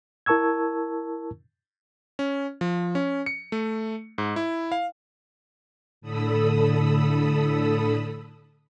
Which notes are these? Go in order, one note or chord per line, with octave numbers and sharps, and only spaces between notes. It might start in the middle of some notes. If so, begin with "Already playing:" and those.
E4 A#4 A5 C#6 E6 G#6
C#4
F3
C#4
C#7
A3
G#2
E4
F5
A2 D3 A4 B5 D#6 E6